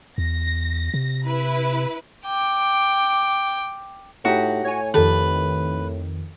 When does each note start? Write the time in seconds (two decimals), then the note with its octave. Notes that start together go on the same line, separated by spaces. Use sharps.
0.18 E2 A#6
0.94 C3
1.25 E4 B4
2.25 G5 D6
4.25 A2 D#4 F#4 G4
4.64 A2 C#5 G#5
4.94 F2 D#3 G4 A4 B4